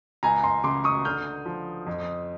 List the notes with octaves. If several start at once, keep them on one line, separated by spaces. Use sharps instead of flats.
C#2 G#5 A#5
A#5 C6
C#3 C6 D6
C#6 D#6
D3 F6 G6
F3
F2